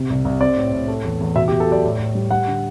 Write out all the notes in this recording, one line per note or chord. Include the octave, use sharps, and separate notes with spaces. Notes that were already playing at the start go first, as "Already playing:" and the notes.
Already playing: C3
C2
C2
C4 D5
A2
A2
A3
E2
E2
B2 E5
G4
B2
A4
F#3 D5
A2
A2
G3
G3 F#5
D3